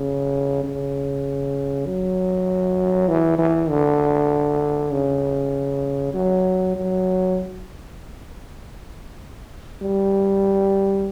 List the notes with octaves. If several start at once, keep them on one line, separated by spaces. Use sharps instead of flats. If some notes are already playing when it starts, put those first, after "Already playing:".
Already playing: C#3
C#3
F#3
E3
E3
D3
C#3
F#3
F#3
G3